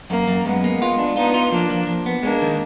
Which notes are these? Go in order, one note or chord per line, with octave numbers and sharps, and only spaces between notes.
F#2 A#3
F#2
F#2 G#3 B3
A#3
F4
D4
B3 D#4 F4
F4
F3 A#3 D4
F3
F3
B3
G#3 A#3 D4
D#3